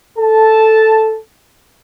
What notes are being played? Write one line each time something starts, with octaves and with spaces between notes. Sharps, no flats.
A4 A5